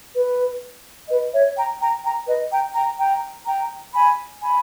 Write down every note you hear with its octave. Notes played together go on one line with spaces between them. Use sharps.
B4
B4 D#5
C#5 E5
G5 A#5
G5 A#5
G5 A#5
B4 D#5
G5 A#5
G5 A#5
G5 A#5
G5 A#5
G#5 B5
G#5 B5